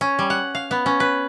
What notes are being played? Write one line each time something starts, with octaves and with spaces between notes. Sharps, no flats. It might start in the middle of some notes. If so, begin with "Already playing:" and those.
C#4
G3
F#5
F5
B3
C#4
B4